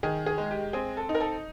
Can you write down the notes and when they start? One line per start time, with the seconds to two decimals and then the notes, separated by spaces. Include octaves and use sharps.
0.03 D#3 G#4
0.26 G#4
0.38 G#3
0.51 G4
0.73 C4 G#4
0.97 A4
1.09 D#4
1.15 A#4
1.21 A4